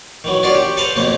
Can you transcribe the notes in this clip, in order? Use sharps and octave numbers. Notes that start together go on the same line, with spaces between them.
D#3 E3 F#3
C#4 D4 F4 F#4 D5
G4
A4 B4 C5 F5 A5 A#5
B1 F2 F3 A3 A#3